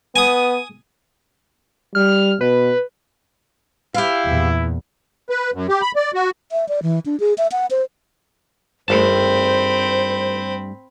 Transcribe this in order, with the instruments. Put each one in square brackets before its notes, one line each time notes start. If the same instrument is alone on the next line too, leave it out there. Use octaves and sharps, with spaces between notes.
[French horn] B3 [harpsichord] G#5 D#6
[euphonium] G3 [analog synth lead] F6
[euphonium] B2 [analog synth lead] B4
[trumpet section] E4 [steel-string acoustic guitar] G4 F5
[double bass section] E2 A#2
[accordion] B4
F#2
G4
B5
D5
F#4
[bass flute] E5
D5
E3
D4
G#4
E5
F#5
C5
[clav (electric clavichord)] G#1 A5 [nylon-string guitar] G2 G3 A3 [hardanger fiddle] C4 B5 [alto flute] C5